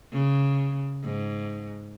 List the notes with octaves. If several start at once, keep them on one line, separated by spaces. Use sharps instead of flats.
C#3
G#2